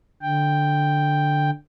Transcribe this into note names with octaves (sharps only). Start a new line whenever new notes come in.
D3 G5